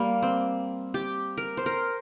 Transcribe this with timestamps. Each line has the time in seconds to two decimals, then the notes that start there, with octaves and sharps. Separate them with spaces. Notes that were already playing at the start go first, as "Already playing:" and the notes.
Already playing: G3 A#3
0.22 C4
0.94 G4
1.37 A#4
1.57 C5
1.66 A#4